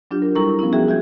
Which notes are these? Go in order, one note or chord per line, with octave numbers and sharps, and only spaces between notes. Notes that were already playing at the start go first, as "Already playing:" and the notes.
F#3 D4 F4 G4
A#4
G3 E4 A4 A#4 A#5 C#6
F3 B3 C#4 E4
F#4 G#4 E5 G5
G#3 F#4 E5 G6 G#6